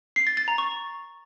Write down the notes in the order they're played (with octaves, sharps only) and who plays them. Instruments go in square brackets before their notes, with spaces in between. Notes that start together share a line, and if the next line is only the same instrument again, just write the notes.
[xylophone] C7
A6
A6
A#5
C#6